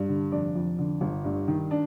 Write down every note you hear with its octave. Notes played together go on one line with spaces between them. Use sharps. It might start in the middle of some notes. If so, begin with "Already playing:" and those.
Already playing: G2
D3
F1 D4 D5
F2
D3
G1
G2
D#3
D4